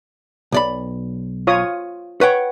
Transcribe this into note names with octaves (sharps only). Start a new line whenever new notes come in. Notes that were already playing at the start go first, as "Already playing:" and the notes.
B1 D5 B5
F4 C#5 D#6
B4 C#5 F#5 G5